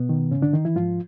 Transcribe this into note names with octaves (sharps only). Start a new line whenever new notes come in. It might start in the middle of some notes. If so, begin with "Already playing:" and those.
Already playing: B2 B3
D#3
G#2 C#3 C#4
D3 D4
D#3 D#4
E3 E4
G#2 F3 F4